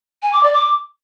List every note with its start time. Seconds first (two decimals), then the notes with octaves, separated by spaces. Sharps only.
0.23 G#5
0.33 D6
0.43 D5
0.54 D6